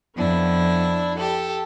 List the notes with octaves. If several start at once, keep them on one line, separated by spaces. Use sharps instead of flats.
F2 B3 D4 E4
G4 A4